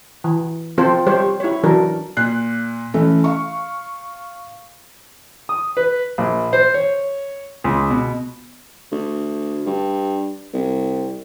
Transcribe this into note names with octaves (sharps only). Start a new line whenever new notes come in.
E3
F3 C4 F4 A4 C5
G3 G4 C5 C#5
E4 C#5
E3 F#3 D4 A4 A#4
A#2 F#6 C7
E3 A3 C#4
F5 C#6
D#6
B4
A#1
C5
C#5
C#2
B2
D2
G2
C2